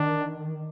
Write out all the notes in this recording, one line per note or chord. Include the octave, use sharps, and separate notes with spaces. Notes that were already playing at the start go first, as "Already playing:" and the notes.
Already playing: D#3 D4